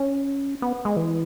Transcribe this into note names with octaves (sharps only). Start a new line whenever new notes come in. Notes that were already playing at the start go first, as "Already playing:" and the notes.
Already playing: C#4
B3
G#3
E3